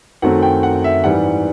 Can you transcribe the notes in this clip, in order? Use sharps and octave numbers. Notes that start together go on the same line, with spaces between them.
F#2 D#3 F#3 A3 C4 F#5
G5
F#5
E5
G#2 E3 G3 F#5